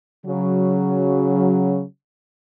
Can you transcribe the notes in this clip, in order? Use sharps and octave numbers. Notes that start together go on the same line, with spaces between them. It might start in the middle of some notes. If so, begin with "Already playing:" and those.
C#3 F#3